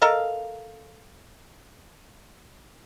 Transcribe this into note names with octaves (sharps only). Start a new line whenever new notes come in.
A4 A#4 D#5 F5